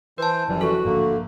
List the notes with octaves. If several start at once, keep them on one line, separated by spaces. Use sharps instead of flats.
E3 B4 C5 A5
F#1 F#2 E3 F3 G3
F#4 A4
G#1 A2 D3 F3 A3 A#3